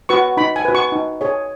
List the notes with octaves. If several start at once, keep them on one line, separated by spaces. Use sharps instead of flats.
F#4 B4 C#6
D#4 B5
G#5
F#4 B4
C#6
D#4
G#4 C#5